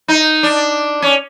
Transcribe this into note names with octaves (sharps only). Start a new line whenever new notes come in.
D#4
D4
C#4